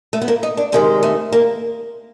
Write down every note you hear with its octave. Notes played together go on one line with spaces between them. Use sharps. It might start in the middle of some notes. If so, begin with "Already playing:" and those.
A3
B3
A#3
D#4
D4
C3 D#3 G#3 A#3
A3
A#3